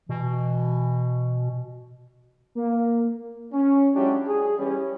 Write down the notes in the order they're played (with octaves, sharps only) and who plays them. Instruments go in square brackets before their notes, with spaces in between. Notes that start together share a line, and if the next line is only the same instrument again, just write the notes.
[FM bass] B2 [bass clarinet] E3
[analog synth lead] A#3
[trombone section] C#4
F#3 G#3 C#4 D4 E4 G4
G#4
E3 G3 C#4